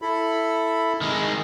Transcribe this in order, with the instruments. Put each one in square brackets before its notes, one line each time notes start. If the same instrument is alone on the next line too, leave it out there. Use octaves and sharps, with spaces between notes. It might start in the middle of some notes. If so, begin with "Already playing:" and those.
[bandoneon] E4 A4 B5
[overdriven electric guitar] D#3 G#3